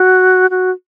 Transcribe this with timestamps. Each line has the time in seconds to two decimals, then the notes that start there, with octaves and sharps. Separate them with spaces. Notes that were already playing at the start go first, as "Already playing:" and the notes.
Already playing: F#4
0.50 F#4